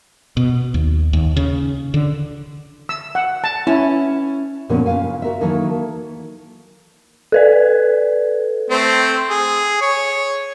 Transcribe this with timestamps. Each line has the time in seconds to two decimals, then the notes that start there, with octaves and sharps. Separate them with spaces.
0.37 B2
0.74 D#2
1.13 D#2
1.36 C#3
1.94 D3
2.89 E6
3.15 F#5
3.44 A5
3.67 C#4 E4
4.69 A#2 D3 F3 A#3 B3 C#4
4.86 C#3 F4 A#4 F5 G#5
5.22 F#4 A#4 E5
5.41 D#3 E3 F#3 A#3 A4 A#4
7.32 A4 B4 D5
8.70 A3 C4 C5
9.30 G#4
9.81 C#5